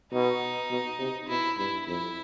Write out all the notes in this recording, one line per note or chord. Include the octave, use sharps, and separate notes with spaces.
B2 D#4
B2
C3
B2 E4
G2 E4
F2 E4